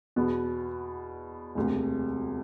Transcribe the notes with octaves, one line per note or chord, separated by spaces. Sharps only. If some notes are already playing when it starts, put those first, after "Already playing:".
E2 B2 B3
E1 D2 C3